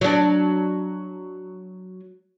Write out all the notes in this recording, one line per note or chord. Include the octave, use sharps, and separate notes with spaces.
F#3 D4